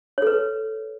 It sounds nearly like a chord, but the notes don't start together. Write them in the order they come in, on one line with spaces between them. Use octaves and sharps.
C#5 A4 B4